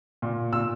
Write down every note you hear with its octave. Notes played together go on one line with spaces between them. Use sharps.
A#2
A#2 E6